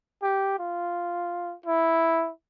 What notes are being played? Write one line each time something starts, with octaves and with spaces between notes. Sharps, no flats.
G4
F4
E4